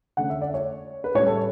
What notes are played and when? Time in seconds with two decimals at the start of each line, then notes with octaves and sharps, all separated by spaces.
0.17 D3 A3 C#4 F#5
0.30 E5
0.41 D5
0.54 C#5
1.04 B4
1.15 A2 G3 C#4 C#5
1.26 A4